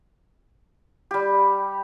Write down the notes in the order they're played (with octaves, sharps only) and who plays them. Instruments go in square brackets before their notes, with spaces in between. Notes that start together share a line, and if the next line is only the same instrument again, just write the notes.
[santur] G3 G4